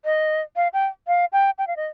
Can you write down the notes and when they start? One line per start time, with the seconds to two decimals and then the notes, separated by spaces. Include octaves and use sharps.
0.05 D#5
0.56 F5
0.73 G5
1.07 F5
1.32 G5
1.58 G5
1.67 F5
1.76 D#5